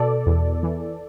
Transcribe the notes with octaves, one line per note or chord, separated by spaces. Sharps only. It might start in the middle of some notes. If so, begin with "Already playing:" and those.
Already playing: B2 A4 D5
E2
E3